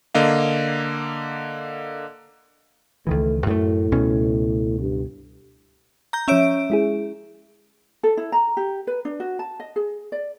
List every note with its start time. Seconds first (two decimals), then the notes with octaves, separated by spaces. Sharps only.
0.15 D3 A#3 D#5 F5
3.07 C#2 D#3 E3 A3
3.46 F#2 A2 A3
3.91 C#2 B2 C#4
4.79 G2
6.13 A#5 G6
6.28 F3 C#4 C#5 E5 E6 D7
6.70 G#3 E4 G#4
8.03 A4
8.17 E4
8.32 A#5
8.57 G4
8.87 B4
9.05 D4
9.20 F#4
9.39 A5
9.60 D#5
9.76 G#4
10.12 D5